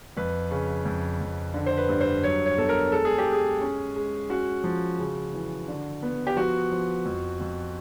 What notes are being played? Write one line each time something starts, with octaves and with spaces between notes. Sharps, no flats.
F2 B4
C#3
F2
F2
D3
C5
B4
G2
C5
F#3 C#5
C#5
B2 A4
A#4
G#3 A4
G#4
G4
G#3
G#4
C#4
G#3
C#4 F#4
F3
C#3
E3
D3
B3
G4
F3 F#4
F3
F2
F2